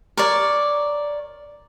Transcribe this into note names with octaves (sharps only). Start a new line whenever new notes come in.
A#4 C#5 D5